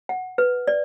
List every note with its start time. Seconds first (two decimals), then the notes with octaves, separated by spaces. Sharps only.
0.09 F#5
0.38 B4
0.68 D5